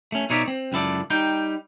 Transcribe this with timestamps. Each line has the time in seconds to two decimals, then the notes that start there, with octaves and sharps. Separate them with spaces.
0.12 A3 C#4
0.30 B2 D#4 C#5 D5 E5
0.48 C4
0.72 C#2 F#2 E4 A4 D5
1.10 G3 D#4 G5